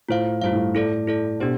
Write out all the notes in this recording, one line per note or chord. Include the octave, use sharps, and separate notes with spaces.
A2 F4 C5 F5
G2 F4 C5 F5
A2
A2 E4 A4 D5
E4 A4 D5
B2 D4 G4 C5